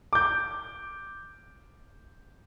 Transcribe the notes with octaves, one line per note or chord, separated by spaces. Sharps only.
D6 G6